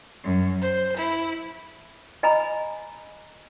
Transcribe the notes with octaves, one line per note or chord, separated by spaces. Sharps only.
F#2
C5
E4
D#5 G#5 A#5 B5